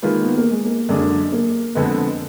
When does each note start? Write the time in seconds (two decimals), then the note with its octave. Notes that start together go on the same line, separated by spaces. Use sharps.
0.02 D#3 G#3 A#3 F4 B4
0.25 B3
0.38 A#3
0.51 G#3
0.65 A#3
0.89 F#2 D3 G#3 D4 G#4
1.32 A#3
1.75 F2 D3 G#3 B3